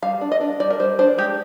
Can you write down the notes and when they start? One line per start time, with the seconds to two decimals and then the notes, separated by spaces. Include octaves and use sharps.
0.02 G3 F5
0.21 D4
0.32 D#5
0.40 D4
0.60 G3 D5
0.70 A#4
0.79 G3 C5
0.99 D4 C5
1.18 G#3 G4